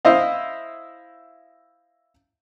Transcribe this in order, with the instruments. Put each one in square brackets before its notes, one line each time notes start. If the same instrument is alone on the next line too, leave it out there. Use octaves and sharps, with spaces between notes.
[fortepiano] E4 C5 D#5 F5